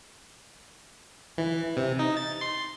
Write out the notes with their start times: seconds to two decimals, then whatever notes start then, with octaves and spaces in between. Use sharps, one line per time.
1.38 E3
1.77 C3
1.99 D#4
2.17 A6
2.41 C6